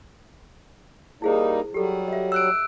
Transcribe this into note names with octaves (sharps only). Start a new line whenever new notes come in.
G3 A#3 D#4 E4 G#4 C5
F#3 G3 G4 A4
D#5 E5
E6 F#6 D7